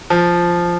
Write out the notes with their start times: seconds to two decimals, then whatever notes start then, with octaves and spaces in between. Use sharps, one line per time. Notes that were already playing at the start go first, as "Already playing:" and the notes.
0.10 F3